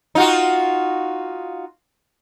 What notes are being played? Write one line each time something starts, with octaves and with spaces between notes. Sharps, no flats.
D#4 F4 F#4